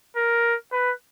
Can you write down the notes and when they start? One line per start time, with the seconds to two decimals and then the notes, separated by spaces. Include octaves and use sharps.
0.16 A#4
0.72 B4